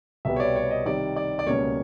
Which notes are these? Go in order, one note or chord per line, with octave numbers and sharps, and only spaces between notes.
C2 B2 G3 B3 E5
C#5
D5
C#5
D#5
C3 D#3 G3 D5
D5
D5
C#2 B2 G3 A#3 C#4 C#5